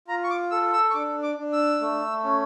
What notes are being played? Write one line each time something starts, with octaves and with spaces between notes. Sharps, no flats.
F4 A#5
C#6
D6
A4 E6
E6
C#6
D4 D6
D6
D4
E6
A3
C#4